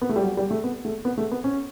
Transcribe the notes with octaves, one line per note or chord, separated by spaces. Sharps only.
B3
A3
G3
F#3
G3
A3
B3
A3
B3
A3
B3
C#4